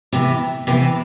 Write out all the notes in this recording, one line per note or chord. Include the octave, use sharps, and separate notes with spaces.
C3 E3 B3 E4
C3 E3 B3 E4